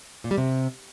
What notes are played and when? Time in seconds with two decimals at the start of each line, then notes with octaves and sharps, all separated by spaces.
0.24 A#2
0.31 G3
0.38 C3